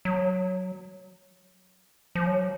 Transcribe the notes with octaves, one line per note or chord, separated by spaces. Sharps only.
F#3
F3
F#3